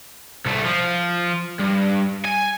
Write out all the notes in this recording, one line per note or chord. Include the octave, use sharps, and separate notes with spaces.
C2 A3
F3
G2
G#5